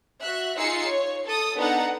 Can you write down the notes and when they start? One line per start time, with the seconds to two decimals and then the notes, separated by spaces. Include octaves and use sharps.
0.21 F#4 E5 F#6
0.58 D#4 F4 G#4 E6 C7 C#7
0.87 C#5
1.26 A4 D#6
1.57 B3 D4 D#4 A4 F#5 A#5